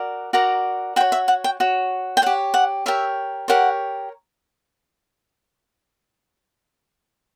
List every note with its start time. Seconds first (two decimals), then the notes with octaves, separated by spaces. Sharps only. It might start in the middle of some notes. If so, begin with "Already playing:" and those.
Already playing: F#4 A#4 D5
0.33 F#4 A#4 D5 A#5
0.96 F#4 G5
1.00 C#5
1.12 E5
1.28 F#5
1.44 G5
1.60 F#4 C#5
2.17 G5
2.22 G4 C#5 F#5
2.54 F#5
2.86 G4 A#4 C#5 E5
3.48 G4 A#4 C#5 F#5